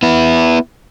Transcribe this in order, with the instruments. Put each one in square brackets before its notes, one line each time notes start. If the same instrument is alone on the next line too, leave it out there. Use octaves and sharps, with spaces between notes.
[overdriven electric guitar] B3 E4